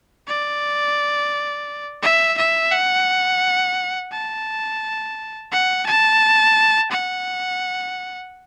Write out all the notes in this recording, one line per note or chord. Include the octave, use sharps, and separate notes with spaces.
D5
E5
E5
F#5
A5
F#5
A5
F#5